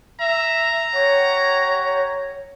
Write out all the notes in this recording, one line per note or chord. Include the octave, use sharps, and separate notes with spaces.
E5 A#5
G4 C#5 F#5 C#6